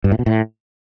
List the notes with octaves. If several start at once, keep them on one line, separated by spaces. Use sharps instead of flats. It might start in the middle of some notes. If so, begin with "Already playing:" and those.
G2
A2
B2
A2